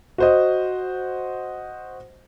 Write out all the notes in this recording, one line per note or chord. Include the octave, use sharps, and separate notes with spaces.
F#4 C5 D#5